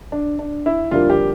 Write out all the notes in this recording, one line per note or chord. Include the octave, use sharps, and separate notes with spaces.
D4
D4
E4
F2 D3 G3 A#3 F4
G4